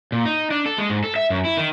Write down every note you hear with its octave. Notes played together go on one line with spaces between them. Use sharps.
A#2
D#4
D4
A4
G#3
G#2
A4
E5
F#2
E4
D#3